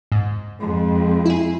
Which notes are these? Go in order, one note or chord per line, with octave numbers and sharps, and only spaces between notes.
G#2
F2 G#3
E4 G#4